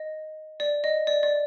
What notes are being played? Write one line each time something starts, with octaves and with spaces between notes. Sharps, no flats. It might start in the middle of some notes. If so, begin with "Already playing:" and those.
Already playing: D#5
D5
D#5
D5
D5